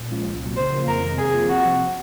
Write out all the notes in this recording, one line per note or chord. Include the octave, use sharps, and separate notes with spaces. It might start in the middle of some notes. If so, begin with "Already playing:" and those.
Already playing: A#2
F3 G#3 C#4 F4
C2
A#2 F#3
C#3 C5
F3 A#3 F4
F2 A#4
C3 D#3 G#3
C3 G#4
F3 A#3 F4
C3 F#4
F3 C4